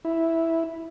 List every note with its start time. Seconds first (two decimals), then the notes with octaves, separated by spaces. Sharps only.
0.05 E4